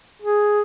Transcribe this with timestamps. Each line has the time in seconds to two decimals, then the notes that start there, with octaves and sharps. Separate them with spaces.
0.22 G#4